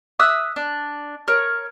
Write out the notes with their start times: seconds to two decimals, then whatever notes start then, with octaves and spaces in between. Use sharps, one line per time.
0.19 E5 D#6 E6 F#6
0.56 D4
1.28 A#4 C#5